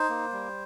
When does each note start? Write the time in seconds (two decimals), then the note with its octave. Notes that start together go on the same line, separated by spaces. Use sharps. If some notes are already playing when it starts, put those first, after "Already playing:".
Already playing: D#4 C5
0.09 A#3
0.32 G3